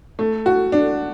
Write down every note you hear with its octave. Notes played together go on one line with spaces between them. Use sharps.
A3
F#4
D4